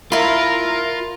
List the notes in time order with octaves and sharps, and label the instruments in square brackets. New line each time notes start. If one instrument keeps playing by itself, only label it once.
[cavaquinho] E4 B5 [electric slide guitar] F4 [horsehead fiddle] A#4